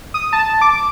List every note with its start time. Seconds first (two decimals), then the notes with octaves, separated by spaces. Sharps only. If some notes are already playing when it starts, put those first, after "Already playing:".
0.14 D#6
0.33 A5
0.62 D6